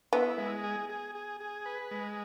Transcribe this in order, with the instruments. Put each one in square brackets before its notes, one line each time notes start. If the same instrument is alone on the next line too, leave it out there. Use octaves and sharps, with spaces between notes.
[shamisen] B3 [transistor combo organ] E4
[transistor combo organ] G#3
G#4
G#4
G#4
G#4
B4
G#3